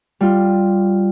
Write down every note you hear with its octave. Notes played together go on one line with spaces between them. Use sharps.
G3 F4